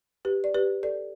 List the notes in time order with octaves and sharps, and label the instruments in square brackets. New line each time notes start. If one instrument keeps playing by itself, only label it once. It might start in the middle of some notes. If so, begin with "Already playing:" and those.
[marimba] G4 B4
D5
G4 B4
A4 D5